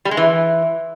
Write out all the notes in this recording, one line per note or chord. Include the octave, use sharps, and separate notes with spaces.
G3
G#3
E3